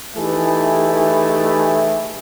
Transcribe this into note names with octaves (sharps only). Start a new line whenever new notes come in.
E3 A3 D#4 E4 G4 G#4